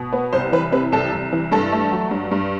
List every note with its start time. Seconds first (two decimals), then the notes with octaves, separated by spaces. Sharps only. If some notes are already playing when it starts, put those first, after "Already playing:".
Already playing: B2
0.13 B3
0.33 C2 C5
0.52 E3 B4
0.72 C3 B4
0.92 C2 A4
1.12 C2
1.33 E3
1.52 G2 A4
1.72 A3
1.92 F#3
2.11 G2
2.31 G2